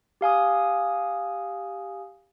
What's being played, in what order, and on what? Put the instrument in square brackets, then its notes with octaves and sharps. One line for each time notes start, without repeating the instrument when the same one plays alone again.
[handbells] G4 F5 G#5 D#6